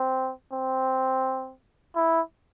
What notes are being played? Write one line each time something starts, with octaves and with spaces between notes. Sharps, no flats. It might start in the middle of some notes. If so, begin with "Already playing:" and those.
Already playing: C4
C4
E4